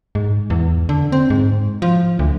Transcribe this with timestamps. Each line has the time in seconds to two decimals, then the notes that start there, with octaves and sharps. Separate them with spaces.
0.15 G#2
0.50 E2
0.89 D3
1.12 C4
1.30 G#2
1.82 F3
2.19 D2